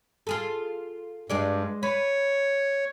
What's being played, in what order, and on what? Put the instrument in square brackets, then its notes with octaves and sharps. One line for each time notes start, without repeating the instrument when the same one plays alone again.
[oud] F4 G#4 A4
[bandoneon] G2 [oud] G#3 G#4 D5
[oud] B4 [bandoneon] C#5